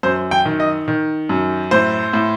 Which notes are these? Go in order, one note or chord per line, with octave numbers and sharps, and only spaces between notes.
F#2 C5
G5
D#3
D#5
D#3
F#2
A2 C5
A2